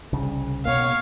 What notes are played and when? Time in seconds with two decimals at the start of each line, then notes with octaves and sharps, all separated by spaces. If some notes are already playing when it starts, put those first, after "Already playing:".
0.13 C2 C#3
0.65 B2 A#3 C#5 F5